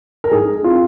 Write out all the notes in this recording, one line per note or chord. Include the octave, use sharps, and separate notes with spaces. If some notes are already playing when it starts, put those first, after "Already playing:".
A#4
G#2 G#4
C4 F4